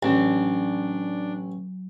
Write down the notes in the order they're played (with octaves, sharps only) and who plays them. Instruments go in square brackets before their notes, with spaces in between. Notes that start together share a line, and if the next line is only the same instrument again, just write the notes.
[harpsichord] A1 [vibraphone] F#3 [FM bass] D4